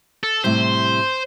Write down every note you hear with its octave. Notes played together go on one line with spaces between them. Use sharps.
A4
A2 C3 G3 C5